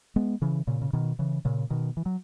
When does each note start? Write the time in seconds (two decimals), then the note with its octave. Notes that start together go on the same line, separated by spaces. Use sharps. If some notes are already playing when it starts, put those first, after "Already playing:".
0.16 G#3 B3
0.42 C#3 E3
0.67 A#2 C#3
0.82 C#3
0.93 B2 D#3
1.19 C#3 E3
1.45 A#2 C#3
1.70 B2 D#3
1.97 E3
2.06 F#3